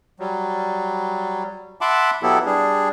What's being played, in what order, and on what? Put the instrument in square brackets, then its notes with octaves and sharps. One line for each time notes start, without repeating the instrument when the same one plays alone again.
[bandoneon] F#3 G3
E5 F#5 A5 B5 C6 D6
B2 F#3 B3 E4 G4 A4
G3 D4 G#4